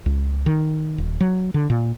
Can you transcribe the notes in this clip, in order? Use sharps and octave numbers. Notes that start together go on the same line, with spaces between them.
C#2
D#3
D#1
F#3
D3
A#2